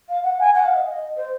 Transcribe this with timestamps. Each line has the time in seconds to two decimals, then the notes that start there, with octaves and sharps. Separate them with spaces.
0.09 F5
0.24 F#5
0.40 G#5
0.54 F#5
0.65 F5
0.75 D#5
1.17 C5